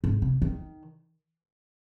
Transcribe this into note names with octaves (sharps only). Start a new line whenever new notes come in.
G#2
C3
D#3